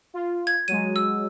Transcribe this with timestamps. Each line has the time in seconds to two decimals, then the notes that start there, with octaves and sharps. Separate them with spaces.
0.14 F4
0.47 G#6
0.68 F#3 G#3 D#7
0.96 E6